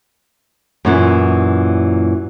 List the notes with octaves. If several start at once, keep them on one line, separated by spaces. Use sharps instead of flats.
F#2 A#2 E3